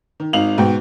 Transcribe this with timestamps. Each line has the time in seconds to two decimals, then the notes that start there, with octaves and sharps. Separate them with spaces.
0.20 D#3
0.33 G#1 D#4 F5 F7 F#7
0.58 G#2 B2 G5